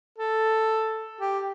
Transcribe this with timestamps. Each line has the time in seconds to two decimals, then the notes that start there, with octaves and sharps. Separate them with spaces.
0.19 A4
1.21 G4